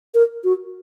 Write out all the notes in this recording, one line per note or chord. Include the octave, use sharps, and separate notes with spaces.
A#4
F#4